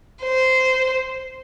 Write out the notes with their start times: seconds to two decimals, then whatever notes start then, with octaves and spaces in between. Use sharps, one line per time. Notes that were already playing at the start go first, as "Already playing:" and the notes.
0.23 C5